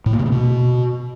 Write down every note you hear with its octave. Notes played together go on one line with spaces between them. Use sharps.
A2
A#3
C3
C#3
B2